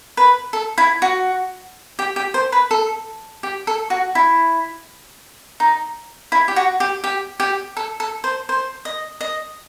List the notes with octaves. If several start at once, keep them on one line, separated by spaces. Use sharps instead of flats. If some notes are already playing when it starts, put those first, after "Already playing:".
B4
A4
E4
F#4
G4
G4
C5
B4
A4
G4
A4
F#4
E4
D#4
E4
G4
F#4
G4
G4
G4
A4
A4
C5
C5
D#5
D#5